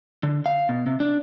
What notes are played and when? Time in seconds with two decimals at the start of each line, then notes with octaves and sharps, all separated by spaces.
0.23 D3
0.46 F5
0.69 B2
0.87 C3
1.00 D4